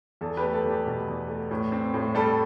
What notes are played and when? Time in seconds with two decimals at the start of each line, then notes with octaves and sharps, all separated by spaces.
0.21 E2 A4
0.37 G4 B4
0.43 A3
0.54 A4
0.64 E2
0.70 G4
0.86 B2
1.08 E2
1.29 A3
1.51 A2
1.72 C4
1.94 A2
2.15 G3 A4